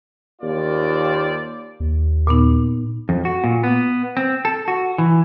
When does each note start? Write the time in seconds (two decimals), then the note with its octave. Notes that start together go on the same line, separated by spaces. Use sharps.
0.42 D#2 A#3 F4 C5 D5
1.80 D#2
2.27 A#2 B3 D#4
3.09 F2
3.25 F#4
3.44 A#2
3.64 B3
4.17 C4
4.45 A4
4.68 F#4
4.98 E3